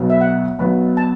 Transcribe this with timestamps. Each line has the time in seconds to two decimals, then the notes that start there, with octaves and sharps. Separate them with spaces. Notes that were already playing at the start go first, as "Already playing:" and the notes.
Already playing: B1 B2 F#3 B3
0.10 E5
0.21 F#5
0.59 B1 B2 F#3 B3 B5
0.97 A5